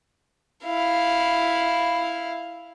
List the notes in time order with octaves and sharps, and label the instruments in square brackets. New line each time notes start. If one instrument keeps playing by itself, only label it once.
[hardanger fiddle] E4 F5